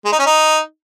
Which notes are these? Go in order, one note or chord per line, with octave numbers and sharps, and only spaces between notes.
G#3
D#4
C#4
D#4